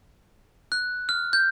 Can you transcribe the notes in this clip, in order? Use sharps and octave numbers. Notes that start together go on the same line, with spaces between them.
F#6
F6
G6